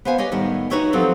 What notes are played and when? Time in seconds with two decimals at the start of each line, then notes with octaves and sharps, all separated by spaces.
0.05 B3 C5 F5 G#5
0.18 G4 C#5 D#5 G#5
0.32 A2 D#3 G3 B3
0.70 D#4 F#4 B4 C#5 E5 G5
0.93 F3 F#3 C4 G4 A4